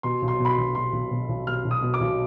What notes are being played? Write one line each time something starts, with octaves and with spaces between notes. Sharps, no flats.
B2 C6
B1
C6
B2
B5
C6
B1
B2 C6
B1
B2
B1
B2 F6
B1
D#6
B2
D6
B1